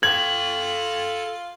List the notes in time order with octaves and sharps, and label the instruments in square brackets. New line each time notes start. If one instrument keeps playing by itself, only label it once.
[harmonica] F4 [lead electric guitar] A4 G5 [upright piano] G#6 [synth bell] F#7